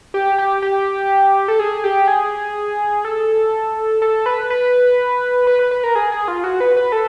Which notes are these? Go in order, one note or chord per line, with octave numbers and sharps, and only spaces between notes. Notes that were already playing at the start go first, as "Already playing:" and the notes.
G4
G4
G4
A4
G#4
G4
G#4
A4
A4
B4
B4
B4
B4
B4
A#4
G#4
G#4
F4
F#4
B4
B4
A4